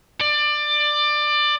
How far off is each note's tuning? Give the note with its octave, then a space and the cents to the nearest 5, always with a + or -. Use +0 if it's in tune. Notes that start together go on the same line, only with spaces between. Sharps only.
D5 +20